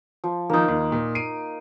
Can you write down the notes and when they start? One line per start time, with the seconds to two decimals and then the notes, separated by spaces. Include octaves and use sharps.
0.24 F3
0.50 D#3 F3 A#3 D#4
0.68 D#2
0.92 A#2
1.15 C7 D7 D#7